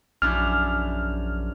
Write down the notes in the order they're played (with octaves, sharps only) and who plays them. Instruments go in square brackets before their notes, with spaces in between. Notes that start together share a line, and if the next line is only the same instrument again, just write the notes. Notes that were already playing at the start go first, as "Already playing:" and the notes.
[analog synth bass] A#1 [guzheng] F#2 D4 E4 [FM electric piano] F6